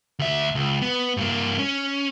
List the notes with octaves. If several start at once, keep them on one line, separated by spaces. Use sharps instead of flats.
D2 E5
C#2
B3
G2 A#3
C#4